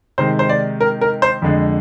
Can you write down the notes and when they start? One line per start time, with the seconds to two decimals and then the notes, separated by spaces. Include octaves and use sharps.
0.18 C3 D#3 G#3 C5
0.39 C5
0.49 D5
0.81 A#4
1.01 A#4
1.22 C5
1.42 F2 D3 G#3